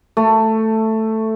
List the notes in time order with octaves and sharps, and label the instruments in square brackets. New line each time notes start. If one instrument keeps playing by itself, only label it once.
[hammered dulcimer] A3